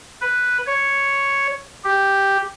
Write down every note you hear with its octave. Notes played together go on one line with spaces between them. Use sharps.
B4
C#5
G4